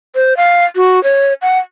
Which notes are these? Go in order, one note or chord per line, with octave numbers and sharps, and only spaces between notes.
C5
F5
F#4
C#5
F#5